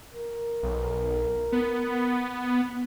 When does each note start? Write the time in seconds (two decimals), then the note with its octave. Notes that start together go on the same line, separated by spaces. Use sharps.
0.14 A#4
0.63 B1
1.52 B3